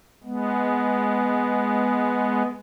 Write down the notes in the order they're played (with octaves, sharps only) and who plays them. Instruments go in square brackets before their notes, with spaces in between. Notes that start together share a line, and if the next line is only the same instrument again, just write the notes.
[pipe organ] G#3 B3